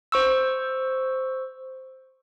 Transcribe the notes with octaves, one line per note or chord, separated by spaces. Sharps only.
C5 C#6 E6